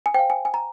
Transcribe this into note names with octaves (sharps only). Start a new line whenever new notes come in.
G#5
C5 F5 G5
G#5
G#5
A#5